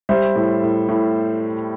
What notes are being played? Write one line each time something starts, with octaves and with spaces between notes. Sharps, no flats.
G3 C5 E5
A2
A2
A2